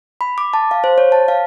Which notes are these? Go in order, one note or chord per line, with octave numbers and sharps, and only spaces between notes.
B5
D6
A5
F5
C5
C#5
A5
F5